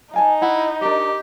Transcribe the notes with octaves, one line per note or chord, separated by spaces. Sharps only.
D#4 F5 G#5 A5
E4 F#5
D4 G4 A#4 D#5